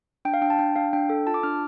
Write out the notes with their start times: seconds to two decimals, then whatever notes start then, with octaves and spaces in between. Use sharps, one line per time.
0.25 D4 G5
0.34 F5
0.42 D4 G5
0.50 A5
0.59 D4 G5
0.76 D4 F5
0.93 D4 G5
1.10 A4
1.27 F4 A5
1.34 D6
1.43 D4 F6